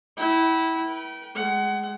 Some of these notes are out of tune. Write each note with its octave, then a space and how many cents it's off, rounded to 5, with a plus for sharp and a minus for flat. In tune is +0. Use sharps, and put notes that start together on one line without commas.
E4 -15 G5 -45
B4 -40 G5 -30
G#3 +0 F#5 +25